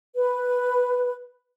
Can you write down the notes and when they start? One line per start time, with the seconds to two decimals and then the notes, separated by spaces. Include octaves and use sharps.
0.17 B4